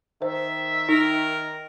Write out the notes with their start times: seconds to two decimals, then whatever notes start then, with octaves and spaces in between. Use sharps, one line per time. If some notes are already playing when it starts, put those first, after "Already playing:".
0.22 D#3 C5 E5
0.89 D#4 A#4